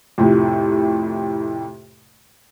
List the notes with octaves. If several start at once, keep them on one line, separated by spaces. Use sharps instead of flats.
F2 A2 C3